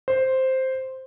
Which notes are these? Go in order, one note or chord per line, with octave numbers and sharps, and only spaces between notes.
C5